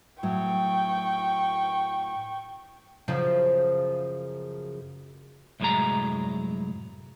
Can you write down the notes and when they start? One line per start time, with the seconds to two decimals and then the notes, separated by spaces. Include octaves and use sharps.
0.23 A2 F#3 G5 C#6
3.08 F#2 C#3 F3
5.60 C2 F#2 A2 F#3 G#3 A#5